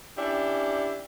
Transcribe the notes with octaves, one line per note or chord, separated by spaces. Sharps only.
C#4 D4 E4 G4